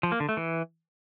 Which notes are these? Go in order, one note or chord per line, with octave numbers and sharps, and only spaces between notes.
F3
A#3
D3
A3
E3